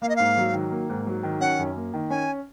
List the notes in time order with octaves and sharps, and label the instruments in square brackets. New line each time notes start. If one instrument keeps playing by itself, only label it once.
[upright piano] A#3 [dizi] F5
[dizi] D#5
[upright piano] G#2 [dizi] F5
[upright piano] F#3
D#3
A#3
G#2
F#3
D#3
[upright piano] C#4 [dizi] F#5
[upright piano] F#2
A#3
D#3
[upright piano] C#4 [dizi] G#5